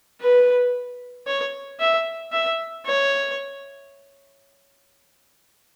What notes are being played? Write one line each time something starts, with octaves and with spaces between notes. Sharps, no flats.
B4
C#5
E5
E5
C#5